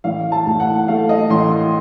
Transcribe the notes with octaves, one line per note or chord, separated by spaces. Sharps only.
A1 F5
A5
A2
F#5
A3 F5
D#5
A1 C6
C6